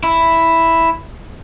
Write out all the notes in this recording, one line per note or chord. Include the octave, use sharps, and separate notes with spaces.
E4